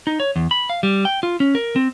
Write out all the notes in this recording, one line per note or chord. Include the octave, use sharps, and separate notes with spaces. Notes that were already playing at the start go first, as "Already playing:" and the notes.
D#4
C#5
E2
B5
F5
G3
G5
F4
C#4
A#4
C4